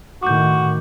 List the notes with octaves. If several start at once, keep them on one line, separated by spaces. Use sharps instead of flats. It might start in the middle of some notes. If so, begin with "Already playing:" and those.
A2 D#3 F#4 D6 G6